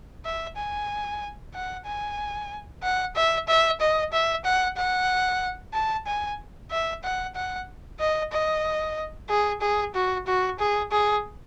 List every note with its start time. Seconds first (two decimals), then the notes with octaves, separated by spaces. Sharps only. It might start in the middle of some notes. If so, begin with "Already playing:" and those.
0.25 E5
0.57 G#5
1.54 F#5
1.86 G#5
2.82 F#5
3.16 E5
3.48 E5
3.81 D#5
4.12 E5
4.45 F#5
4.77 F#5
5.73 A5
6.07 G#5
6.70 E5
7.03 F#5
7.35 F#5
8.00 D#5
8.32 D#5
9.29 G#4
9.61 G#4
9.94 F#4
10.26 F#4
10.59 G#4
10.91 G#4